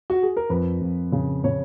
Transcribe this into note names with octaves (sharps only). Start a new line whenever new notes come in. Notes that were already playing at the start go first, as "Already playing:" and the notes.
F#4
G#4
A#4
F2 B4
F2
C#3
C#3 C#5